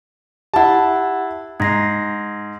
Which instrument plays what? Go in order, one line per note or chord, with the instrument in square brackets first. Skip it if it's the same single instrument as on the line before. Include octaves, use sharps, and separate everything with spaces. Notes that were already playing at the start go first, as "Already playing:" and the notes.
[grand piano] E4 A5 [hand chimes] G4 F#5
[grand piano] G#2 [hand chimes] G#6 A#6 C7